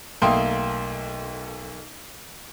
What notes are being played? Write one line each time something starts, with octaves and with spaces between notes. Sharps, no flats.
B1 A3 A#3 G5 C6 D#6